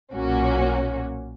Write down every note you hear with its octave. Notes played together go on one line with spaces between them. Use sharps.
B1 A#2 A#3 C#4 F#4